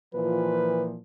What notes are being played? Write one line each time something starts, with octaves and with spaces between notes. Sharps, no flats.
A#2 E3 F3 B4